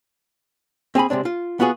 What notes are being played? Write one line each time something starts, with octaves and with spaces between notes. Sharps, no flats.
C4 G#4 G#5 B5
C3 G#3 C4 D4
F4
B3 F4 F#4 G#4